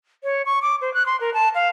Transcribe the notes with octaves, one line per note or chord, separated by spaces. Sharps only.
C#5
C#6
D6
C5
F#6
C6
A#4
A5
F5